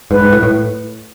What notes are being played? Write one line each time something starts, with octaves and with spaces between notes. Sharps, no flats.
G#2 B4
G#2
A2
A2